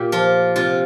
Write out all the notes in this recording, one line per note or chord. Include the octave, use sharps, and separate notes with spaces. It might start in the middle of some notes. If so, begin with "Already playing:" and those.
Already playing: A#2 G4
F3 F4
C3 F4